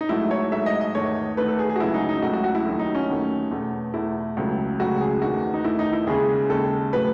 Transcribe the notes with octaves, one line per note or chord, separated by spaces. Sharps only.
D#4
G#2 F#3 A3 E4
C#5
G#2 F#3 A3 E5
D#5
D#5
E2 D#3 A3 C#5
E2 D#3 A3 B4
A4
G#4
G#4
F#4
C#2 C#3 F#3 A3 E4
D#4
D#4
C#2 C#3 F#3 A3 F#4
F#4
F#4
E4
D#2 D#3 F#3 A3 E4
D#4
C#4
D#2 D#3 F#3 A3
E2 B2 A3
E2 B2 A3 E4
C#2 C#3 F#3 A3
C#2 C#3 F#3 A3 F#4
G#4
E2 D#3 A3 F#4
D#4
E2 D#3 A3 E4
D#4
E4
D#2 C#3 G#3 G#4
D#2 C#3 G#3 A4
A2 F#3 A3 B4